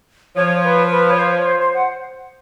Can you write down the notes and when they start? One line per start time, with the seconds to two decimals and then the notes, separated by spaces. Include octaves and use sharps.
0.36 F3 C#5
0.64 B4
0.92 B4
1.10 C#5
1.19 C5
1.38 C#5
1.46 C5
1.59 C5
1.74 F#5